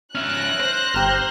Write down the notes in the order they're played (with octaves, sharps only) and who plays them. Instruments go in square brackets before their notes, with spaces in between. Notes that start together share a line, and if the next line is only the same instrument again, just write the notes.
[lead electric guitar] C#4 E5 [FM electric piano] F6 [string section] F#6 A#6
[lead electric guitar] C5
[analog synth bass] G1 [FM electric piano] G4 A#5 F6